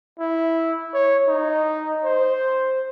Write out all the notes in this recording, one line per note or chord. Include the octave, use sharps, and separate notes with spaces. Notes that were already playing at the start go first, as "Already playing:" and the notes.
E4
C#5
D#4
C5